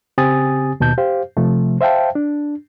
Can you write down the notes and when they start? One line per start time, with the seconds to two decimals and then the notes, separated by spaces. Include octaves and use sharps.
0.18 C#3 C4 G4 G#5 D#6 A6
0.80 D#2 B2 A5 G6
0.98 G4 C5 F5
1.37 C3 F3 A3
1.81 C5 E5 F5 G5 A5
2.15 D4